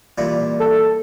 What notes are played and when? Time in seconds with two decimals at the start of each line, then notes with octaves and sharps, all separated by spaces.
0.18 A#2 E3 G3
0.59 A4